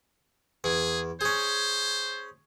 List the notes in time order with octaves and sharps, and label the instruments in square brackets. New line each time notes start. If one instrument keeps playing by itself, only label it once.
[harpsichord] E2 [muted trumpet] G#4
[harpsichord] C#4 G#4 [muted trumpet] C5